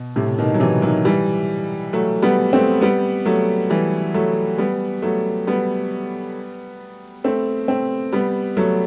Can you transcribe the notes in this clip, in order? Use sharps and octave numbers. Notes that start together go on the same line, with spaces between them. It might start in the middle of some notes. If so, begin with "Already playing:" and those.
Already playing: B2
A2 C3
B2 D#3
F#3
C3 E3
D#3 F#3
E3 G3
F#3 A3
G3 B3
A3 C4
G3 B3
F#3 A3
E3 G3
F#3 A3
G3 B3
F#3 A3
G3 B3
A3 C4
A3 C4
G3 B3
F#3 A3